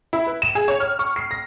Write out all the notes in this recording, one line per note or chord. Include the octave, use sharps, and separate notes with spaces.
E4
B4
E7
G#4
C#5
F6
C#6
C7
A#6